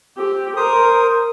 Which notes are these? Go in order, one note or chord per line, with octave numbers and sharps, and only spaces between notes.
C4 G4
A#4 C5 D#6